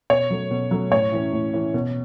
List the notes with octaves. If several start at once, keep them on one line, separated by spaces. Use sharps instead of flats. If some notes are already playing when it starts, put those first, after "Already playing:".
B2 C#5
F#3 A3
B2
F#3 A3
A2 C#5
E3 C#4
A2
E3 C#4
B2